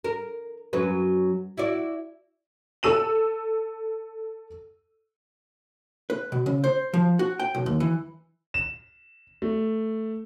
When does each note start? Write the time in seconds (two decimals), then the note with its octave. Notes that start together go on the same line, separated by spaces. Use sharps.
0.04 A#4
0.73 F#2 F#3 B4
1.57 E4 F#4 D5
2.83 A4 E6 D#7 F#7
6.10 B4
6.32 B2
6.46 C#3
6.64 C5
6.94 F3
7.19 F#4
7.40 G5
7.55 B1
7.66 D#2
7.80 E3
8.54 E7
9.42 A3